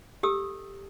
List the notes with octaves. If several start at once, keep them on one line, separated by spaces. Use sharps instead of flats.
G4 A4 D#6 E6